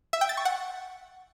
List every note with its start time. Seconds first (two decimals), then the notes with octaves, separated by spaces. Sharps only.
0.13 E5
0.21 G5
0.29 A6
0.37 C#6
0.45 F#5